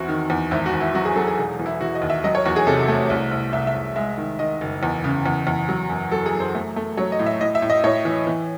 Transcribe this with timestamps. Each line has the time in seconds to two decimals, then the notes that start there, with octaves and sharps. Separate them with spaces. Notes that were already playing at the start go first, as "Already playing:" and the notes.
Already playing: E2 C4 E4 F#4
0.08 D#3
0.30 E2
0.51 G#1 E4
0.66 F#4
0.73 G#1
0.80 E4
0.95 F#3 F#4
1.05 G#4
1.16 F#3 A4
1.27 G#4
1.38 E1 G#4
1.59 E3
1.66 E4
1.81 E3 F#4
1.95 D#5
2.02 D#2
2.10 E5
2.24 F#3 D#5
2.35 C#5
2.45 E2 F#4
2.56 G#4
2.67 C3 A4
2.88 A3
3.10 C2
3.31 C2
3.53 C2 E5
3.67 E5
3.75 C2
3.96 G#3 E5
4.18 D#3
4.39 D#3 D#5
4.61 F#1
4.83 E2
5.04 C#3
5.26 E2
5.47 E2
5.69 F#3
5.90 F#2
6.11 F#3 A4
6.26 G#4
6.33 F#2
6.40 C5
6.55 A3
6.76 A3
6.97 F#3 C#5
7.12 D#5
7.19 A2
7.26 E5
7.41 A2 D#5
7.55 E5
7.62 A2
7.70 D#5
7.84 A2 C#5
8.05 E3
8.27 E3